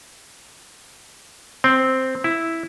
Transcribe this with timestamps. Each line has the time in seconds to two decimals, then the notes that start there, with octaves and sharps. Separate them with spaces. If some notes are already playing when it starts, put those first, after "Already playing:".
1.64 C4
2.24 E4